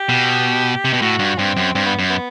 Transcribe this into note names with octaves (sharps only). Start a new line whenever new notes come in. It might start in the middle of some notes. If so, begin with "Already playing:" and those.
Already playing: G4
B2
C3
B2
A2 F#4
G2
G2 C4
F#2
G2 C4
B3
F#2
B3